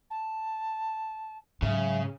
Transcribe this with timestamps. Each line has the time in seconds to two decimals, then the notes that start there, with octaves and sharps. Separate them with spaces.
0.10 A5
1.62 G#2 C#3 F#3 E5